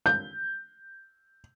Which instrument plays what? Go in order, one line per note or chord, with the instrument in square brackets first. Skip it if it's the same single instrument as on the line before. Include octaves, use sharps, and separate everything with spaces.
[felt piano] G6